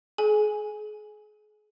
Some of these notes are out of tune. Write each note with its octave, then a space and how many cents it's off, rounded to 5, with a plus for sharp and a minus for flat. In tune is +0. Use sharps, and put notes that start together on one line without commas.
G#4 +35 G#5 +0